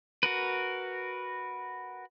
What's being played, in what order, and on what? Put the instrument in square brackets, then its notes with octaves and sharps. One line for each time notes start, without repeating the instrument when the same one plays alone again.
[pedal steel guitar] F#4 A#4 B4